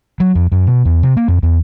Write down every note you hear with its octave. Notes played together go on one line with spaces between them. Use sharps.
F#3
F2
F#2
B2
E2
C3
A#3
F2
E2